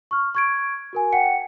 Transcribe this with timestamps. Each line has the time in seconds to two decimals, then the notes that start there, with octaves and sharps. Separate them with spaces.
0.11 C#6 F6
0.35 C#6 G#6 D7
0.93 F#4 A#4 G#5
1.13 F#5 G5 C#7